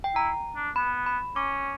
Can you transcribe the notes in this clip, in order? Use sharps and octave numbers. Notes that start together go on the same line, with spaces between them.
G5
E4 A#5
D4
B3 B5
B5
C#4 D6